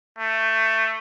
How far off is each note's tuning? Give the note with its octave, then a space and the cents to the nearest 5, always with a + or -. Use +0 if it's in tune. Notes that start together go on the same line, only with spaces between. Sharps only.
A3 +15